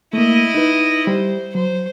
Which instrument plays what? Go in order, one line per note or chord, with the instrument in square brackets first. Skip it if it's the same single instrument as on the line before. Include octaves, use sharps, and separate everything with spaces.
[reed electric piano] A3 A#3 [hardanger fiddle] E4 D#5
[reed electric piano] D#4 B4
[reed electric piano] G3 [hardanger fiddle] C5
[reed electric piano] F#3 [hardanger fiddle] C5